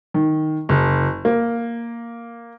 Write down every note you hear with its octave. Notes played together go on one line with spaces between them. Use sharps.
D#3
F#1
A#3